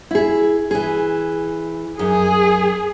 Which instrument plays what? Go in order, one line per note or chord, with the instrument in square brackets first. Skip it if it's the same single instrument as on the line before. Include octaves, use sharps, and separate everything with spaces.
[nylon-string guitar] E4 G#4
E3 G#4
[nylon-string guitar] F#2 [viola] G#4